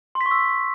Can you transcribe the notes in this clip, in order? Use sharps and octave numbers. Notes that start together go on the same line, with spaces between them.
C6
B6
C#6
E6